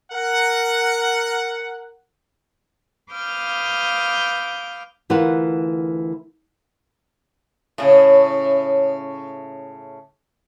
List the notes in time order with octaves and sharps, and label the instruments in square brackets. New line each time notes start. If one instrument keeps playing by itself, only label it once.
[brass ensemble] A#4 F#5
[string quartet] B4 F5 D6 D#6 F6 G6
[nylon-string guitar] D2 E3 F4 A#4 B4 F#5
[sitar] A2 C#3